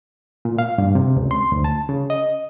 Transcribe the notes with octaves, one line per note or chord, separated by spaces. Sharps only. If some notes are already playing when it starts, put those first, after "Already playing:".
A#2
F5
G2
C3
C#2
C6
D2
A5
C#3
D#5